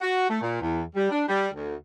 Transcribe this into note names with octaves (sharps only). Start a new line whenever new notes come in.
F#4
A3
A#2
E2
G3
D4
G3
D2